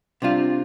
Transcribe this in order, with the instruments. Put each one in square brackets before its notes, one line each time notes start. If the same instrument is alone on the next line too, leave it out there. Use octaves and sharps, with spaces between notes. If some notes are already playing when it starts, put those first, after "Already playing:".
[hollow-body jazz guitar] C3 G3 D4 F4